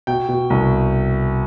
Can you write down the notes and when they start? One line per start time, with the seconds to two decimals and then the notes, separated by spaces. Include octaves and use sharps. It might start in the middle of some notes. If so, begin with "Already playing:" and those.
0.07 B2 G5
0.28 B2
0.50 C2